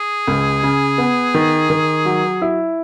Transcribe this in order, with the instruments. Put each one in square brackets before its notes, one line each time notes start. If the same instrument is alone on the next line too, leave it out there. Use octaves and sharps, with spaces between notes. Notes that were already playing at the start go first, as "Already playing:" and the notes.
Already playing: [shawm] G#4
[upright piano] C#2
C#3
B3
D#3
D#3
F#3
E4